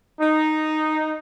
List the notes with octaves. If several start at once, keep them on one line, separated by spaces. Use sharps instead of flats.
D#4